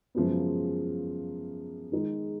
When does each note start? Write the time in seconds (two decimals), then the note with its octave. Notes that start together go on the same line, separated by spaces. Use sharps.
0.15 F#2 C#3 F3 G#3 B3
1.92 D#3 G#3 D#4